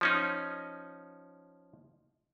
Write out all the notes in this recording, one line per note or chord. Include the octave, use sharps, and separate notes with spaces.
F3 C#4 D#4